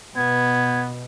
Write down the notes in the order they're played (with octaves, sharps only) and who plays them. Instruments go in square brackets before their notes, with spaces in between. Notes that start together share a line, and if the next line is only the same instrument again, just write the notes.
[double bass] B2 [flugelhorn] B3 [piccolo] G#6